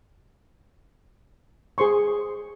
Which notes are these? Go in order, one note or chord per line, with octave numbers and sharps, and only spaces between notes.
G#4 C5 C6 C#6